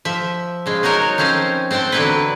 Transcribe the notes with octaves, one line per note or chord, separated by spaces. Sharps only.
F3 E5
C#3 G#3 F4
F#3 D#4 F#4 A#4 C#5
F3 C4 C#4 C5 F5
C4 C5 F#5 G5 A5
D3 E3 F#3 B3 E4 B4